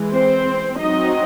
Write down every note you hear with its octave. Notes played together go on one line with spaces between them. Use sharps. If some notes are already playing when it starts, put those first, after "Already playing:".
Already playing: E3 G#3
C4 C5
F#3 C4 D#4 D#5